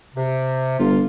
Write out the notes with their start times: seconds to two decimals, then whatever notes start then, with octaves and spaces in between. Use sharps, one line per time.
0.15 C3
0.79 G1 F4